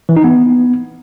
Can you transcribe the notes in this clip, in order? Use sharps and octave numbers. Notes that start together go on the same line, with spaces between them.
E3
D#4
B3